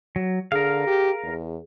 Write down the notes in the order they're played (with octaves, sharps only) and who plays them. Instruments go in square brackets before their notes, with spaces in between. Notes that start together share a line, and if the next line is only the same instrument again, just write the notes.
[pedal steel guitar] F#3
[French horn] D3 [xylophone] G#4 [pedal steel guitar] A#4 F5
[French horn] G4
E2